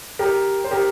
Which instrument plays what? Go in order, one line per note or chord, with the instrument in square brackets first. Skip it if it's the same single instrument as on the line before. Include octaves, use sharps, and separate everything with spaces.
[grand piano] G4 A#4
C5
G4 A#4